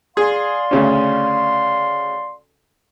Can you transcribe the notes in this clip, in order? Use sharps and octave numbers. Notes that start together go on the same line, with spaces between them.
G#4 D5 F5 C6
D2 C#3 C#4